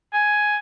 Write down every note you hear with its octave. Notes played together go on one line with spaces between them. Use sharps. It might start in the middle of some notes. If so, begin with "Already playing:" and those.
G#5